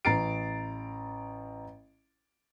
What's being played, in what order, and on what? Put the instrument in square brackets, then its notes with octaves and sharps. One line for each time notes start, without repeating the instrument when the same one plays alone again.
[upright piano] A1 A#5 A6 C7 D7